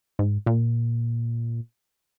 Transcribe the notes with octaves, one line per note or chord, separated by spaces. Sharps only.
G#2
A#2